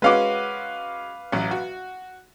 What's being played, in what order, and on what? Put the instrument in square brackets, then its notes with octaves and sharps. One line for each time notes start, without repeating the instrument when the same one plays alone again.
[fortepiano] G#3 C#4 F#4 [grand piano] B4 F5 D6
[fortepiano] A1 F#3
F#4